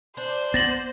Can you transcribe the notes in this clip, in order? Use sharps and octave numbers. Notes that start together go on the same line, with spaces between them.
D4 C5
B3 A6 A#6 F#7